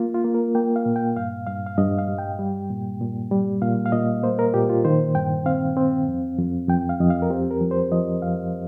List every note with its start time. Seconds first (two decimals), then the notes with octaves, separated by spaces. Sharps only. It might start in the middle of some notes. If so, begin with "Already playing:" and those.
Already playing: A#3 F4
0.14 F4
0.25 A#3
0.34 A#4
0.55 A#3 G5
0.76 F5
0.86 A#2
0.96 G5
1.16 G2 F5
1.47 G2 F5
1.67 F5
1.78 G2 D#5
1.98 F5
2.08 G3
2.19 G5
2.39 G3
2.70 A#2
3.01 A#2
3.31 G3
3.62 A#2 F5
3.86 F5
3.92 A#2 D#5
4.23 A#3 C5
4.39 A#4
4.54 A#2 G4
4.69 F4
4.85 D#3 C5
5.15 G2 G5
5.46 C4 F5
5.77 C4
6.08 F2
6.38 F2
6.69 F2 G5
6.89 F5
7.00 F2 D#5
7.10 F5
7.22 A#4
7.30 C4 G4
7.51 A#4
7.61 F3
7.71 C5
7.92 F3 D#5
8.22 F2 F5